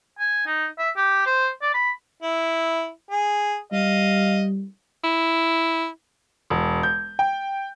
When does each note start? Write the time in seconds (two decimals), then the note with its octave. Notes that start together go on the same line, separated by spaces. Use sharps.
0.19 G#5
0.47 D#4
0.79 E5
0.97 G4
1.27 C5
1.62 D5
1.74 B5
2.22 E4
3.10 G#4
3.72 G3 D#5 F5
5.04 E4
6.50 E1
6.83 G6
7.19 G5